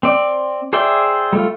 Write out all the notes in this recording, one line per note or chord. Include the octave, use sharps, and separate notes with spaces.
C4 D5
G#4 C5 D5 E5 G5
G3 A3 F4